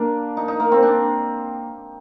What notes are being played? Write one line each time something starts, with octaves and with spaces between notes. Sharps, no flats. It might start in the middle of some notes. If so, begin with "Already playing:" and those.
Already playing: A#3 D4
D#4
D#4
A#3
C4
D4